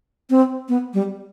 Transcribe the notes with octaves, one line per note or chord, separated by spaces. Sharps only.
C4
B3
G3